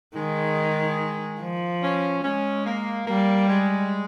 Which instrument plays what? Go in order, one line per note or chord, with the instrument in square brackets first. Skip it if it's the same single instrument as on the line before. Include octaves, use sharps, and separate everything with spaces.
[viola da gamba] D#3 [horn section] G#3
[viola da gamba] F3
[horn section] C#4
[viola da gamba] G#3 [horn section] C#4
[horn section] A#3
[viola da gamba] G3 [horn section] A#3
[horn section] G#3